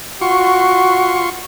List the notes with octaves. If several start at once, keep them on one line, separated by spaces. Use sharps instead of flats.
F4 F#4 C6 C#6